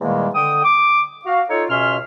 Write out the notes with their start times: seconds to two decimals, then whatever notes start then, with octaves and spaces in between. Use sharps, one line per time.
0.01 E2 A#2 D#3 G3 G#3 A#3
0.35 D3 G5 D#6
0.64 D6
1.25 F#4 F5
1.50 D#4 F4 A4 C#5
1.70 C#2 B2 C#4 E5 C6 F6